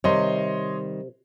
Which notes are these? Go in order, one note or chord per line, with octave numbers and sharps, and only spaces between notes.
C3 D#3 G3 C#5 D#5 C6